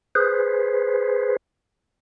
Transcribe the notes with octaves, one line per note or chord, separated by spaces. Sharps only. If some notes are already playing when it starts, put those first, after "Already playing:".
G#4 B4 C5